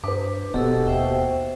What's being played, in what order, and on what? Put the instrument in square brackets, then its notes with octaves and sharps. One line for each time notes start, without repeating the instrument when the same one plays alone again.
[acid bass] G2 [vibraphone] B4 [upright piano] C5 D6
[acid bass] D#1 [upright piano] B2 [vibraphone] G4 A4 E6
[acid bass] D#2 [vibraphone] C5 E5 G5